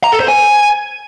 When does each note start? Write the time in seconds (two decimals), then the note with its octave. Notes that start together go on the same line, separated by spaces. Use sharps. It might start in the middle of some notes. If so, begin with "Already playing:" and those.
0.04 A#5
0.12 A4
0.20 C5
0.28 G#5